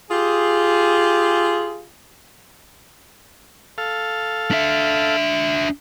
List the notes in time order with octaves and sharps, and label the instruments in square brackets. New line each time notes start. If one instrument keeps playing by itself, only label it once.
[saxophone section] F4 G4 G#4
[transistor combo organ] A4 F5
[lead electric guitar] D4 E5